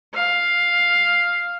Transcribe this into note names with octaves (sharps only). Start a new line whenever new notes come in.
F5